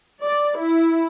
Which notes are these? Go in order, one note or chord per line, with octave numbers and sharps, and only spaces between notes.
D5
E4